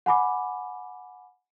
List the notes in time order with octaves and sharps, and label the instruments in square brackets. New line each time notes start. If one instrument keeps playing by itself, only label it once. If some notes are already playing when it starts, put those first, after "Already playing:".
[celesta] F#5 G#5 B5 D6